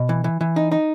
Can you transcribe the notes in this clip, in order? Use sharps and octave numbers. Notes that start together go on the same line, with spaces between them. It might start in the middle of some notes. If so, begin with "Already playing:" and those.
Already playing: B2
E3
E3
E3
D#4
D#4